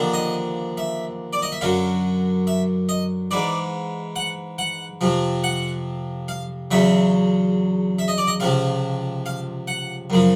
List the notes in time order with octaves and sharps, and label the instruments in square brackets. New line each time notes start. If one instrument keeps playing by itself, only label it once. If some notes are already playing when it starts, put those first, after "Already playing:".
Already playing: [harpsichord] D#2 D3 F3
D#5
E5
D5
D#5
E5
F#2 D3 F#3 F5
E5
D#5
G#2 E3 D5
F#5
F#5
F2 C3 F3
F#5
F5
E2 C#3 F#3 E5
E5
D#5
D5
D#5
C#2 C3 F3 F5
F5
F#5
F#2 C#3 F3